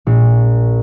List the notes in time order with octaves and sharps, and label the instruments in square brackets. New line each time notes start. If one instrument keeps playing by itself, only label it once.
[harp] A#1